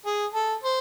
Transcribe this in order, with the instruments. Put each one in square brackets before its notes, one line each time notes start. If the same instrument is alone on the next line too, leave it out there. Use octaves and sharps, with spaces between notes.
[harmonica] G#4
A4
C5